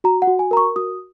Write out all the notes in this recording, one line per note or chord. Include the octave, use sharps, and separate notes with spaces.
F#4 A#5
F#5
F#4
G#5
A#4 A#5
C#6
F#4 D#6